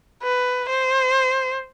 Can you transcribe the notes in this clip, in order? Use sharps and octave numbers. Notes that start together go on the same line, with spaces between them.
B4
C5